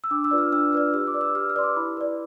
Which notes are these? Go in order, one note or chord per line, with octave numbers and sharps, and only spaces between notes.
E6
D4 D6
E6
F4 B4 D5
F6
D4 E6
F4 B4 D5 F6
G4 E6
D6
B4 D5
E6
G4 F6
F6
B4 D5 C6
D6
E4 B5
B4 D5